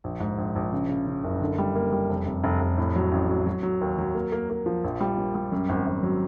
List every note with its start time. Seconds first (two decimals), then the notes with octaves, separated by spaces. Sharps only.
0.04 A#1
0.20 G#2
0.38 A#1
0.56 A#1
0.73 C#3
0.89 C#3
1.07 C#3
1.24 F#1
1.41 D3
1.58 G3
1.75 A#3
1.92 G3
2.09 F1
2.26 F1
2.44 F1
2.61 F1
2.78 A2
2.96 F#3
3.12 A1
3.29 F#3
3.46 F#3
3.63 F#3
3.81 D#2
3.98 F#3
4.15 A#3
4.32 A#3
4.50 A#3
4.66 F3
4.84 A#1
5.00 G3
5.18 A#2
5.35 G3
5.52 F#2
5.69 G#1
5.87 G#1
6.03 F#3